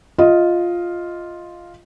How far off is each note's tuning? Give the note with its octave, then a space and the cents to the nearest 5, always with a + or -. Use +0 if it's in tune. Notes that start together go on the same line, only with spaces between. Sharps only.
F4 +0 D#5 +10